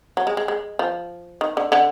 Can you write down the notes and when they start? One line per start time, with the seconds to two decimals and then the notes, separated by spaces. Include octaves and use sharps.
0.17 F#3
0.27 G#3
0.37 G#3
0.48 G#3
0.79 F3
1.41 D#3
1.57 D3
1.72 D3